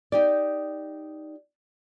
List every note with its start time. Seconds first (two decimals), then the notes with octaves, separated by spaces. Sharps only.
0.12 D#4 G4 D5